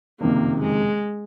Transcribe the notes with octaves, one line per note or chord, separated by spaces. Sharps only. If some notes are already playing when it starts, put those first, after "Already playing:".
F#1 F2 C3 D#3 A#3
G#3